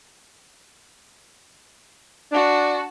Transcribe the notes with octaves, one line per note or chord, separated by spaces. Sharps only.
D4 F#4 A5